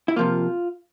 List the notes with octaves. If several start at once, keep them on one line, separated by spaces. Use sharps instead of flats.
E4
C3 F3 A#3 F4